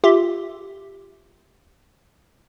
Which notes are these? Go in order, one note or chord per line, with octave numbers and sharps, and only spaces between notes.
F4 G4 E5